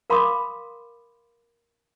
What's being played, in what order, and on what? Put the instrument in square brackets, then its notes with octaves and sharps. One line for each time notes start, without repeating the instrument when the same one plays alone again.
[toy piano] A#4 F5 B5 C6 D6 D#6